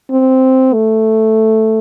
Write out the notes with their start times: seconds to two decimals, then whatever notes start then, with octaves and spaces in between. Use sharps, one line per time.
0.11 C4
0.73 A3